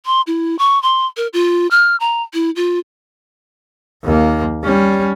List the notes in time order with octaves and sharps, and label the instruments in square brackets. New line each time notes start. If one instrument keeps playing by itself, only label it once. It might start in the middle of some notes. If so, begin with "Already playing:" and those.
[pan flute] C6
E4
C#6
C6
A#4
F4
F6
A#5
E4
F4
[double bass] D#2 A#3
G3 C#4